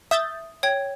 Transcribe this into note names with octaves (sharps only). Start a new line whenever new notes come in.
E5 D#6 G6 A6
C#5 G5 G#6